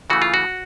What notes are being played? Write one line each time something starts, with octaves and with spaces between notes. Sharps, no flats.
C#3 E3 A3 F#4
F4
F#4